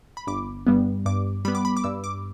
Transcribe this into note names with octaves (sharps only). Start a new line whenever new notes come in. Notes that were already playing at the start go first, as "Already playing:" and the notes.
B5
G1 D6
G2 G3 B3
G2 D6
G3 B3 B5
D6
B5
D6
G2 E6
D6